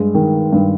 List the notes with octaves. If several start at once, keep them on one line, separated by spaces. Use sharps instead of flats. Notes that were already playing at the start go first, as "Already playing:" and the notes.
Already playing: G2 G#3
D#3
G2